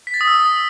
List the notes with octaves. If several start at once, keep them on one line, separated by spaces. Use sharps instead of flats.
B6
A6
D#6
E6
D#6